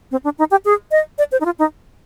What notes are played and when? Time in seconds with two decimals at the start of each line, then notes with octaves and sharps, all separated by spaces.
0.11 C4
0.24 D4
0.39 D#4
0.51 G4
0.65 G#4
0.91 D#5
1.18 D5
1.32 C5
1.41 D#4
1.45 F4
1.59 D#4